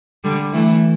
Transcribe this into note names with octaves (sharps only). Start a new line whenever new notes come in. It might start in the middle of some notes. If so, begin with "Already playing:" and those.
D3 G3
E3 A3